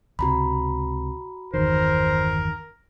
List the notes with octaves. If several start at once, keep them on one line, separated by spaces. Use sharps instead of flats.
C#2 C3 C4 F#4 A#5 B5
G1 E2 D#3 A#4 C5